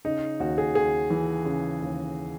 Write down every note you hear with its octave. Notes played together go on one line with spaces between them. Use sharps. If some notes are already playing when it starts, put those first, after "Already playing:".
C#3 D#4
D#2 F#4
G#4
D#2 G#4
E3
C#3
D#2